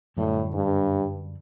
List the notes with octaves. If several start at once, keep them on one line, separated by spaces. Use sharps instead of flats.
F#2 A2 D3 G3
G2